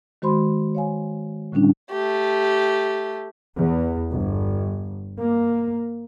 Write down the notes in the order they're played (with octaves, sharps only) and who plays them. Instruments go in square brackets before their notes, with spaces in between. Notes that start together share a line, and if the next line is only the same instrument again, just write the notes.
[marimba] D#3 G#3 F#4 C5 B5 C6
C#5 F5 G#5
A2 D3 G3 C#4 D4 E4
[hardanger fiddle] A3 G4
[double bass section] E2
G1
A#3